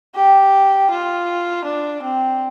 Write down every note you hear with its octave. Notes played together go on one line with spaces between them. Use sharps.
G4
F4
D4
C4